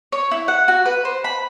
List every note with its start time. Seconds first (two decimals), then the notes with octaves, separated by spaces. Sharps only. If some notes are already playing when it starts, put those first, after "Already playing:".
0.12 C#5
0.31 E4
0.48 F#5
0.68 F#4
0.86 B4
1.05 C5
1.24 B5